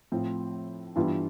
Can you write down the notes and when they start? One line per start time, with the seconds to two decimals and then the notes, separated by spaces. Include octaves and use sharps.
0.12 A2 F3 C4
0.95 G2 E3 G3 B3 F4